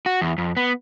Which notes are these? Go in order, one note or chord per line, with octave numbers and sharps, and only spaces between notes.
F#4
E2
F2
B3